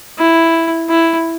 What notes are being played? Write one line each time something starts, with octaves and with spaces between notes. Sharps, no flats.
E4
E4